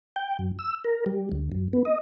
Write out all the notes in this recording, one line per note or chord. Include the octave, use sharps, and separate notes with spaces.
G5
F#2
E6
A#4
G3
D2
F#2
B3
D#5